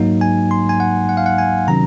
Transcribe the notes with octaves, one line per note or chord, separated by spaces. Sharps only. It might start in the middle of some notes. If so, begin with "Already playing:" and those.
Already playing: G#2 F#3 A#3 D#4
G#5
C6
G#5
F#5
F#5
F5
F#5
G#5
C3 D#3 F#3 C#4 A#5